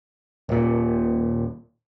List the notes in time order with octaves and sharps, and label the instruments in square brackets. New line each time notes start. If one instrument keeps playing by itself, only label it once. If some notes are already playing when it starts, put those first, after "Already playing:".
[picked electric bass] D#1 A#2